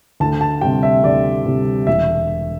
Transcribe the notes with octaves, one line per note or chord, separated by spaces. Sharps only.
D2 A5
A5
C3 G3 G5
E5
D2 D5
C3 G3
E1 E5